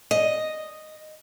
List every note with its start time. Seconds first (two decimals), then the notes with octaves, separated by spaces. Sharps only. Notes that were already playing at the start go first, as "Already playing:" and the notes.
0.11 D#5